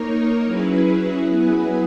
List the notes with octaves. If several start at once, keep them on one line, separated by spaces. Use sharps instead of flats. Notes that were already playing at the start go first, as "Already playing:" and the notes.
Already playing: A#3 D#4 A#4 C#5
F#3 C#4 E4 G#4 B4
F#3 B3 E4 G#4 B4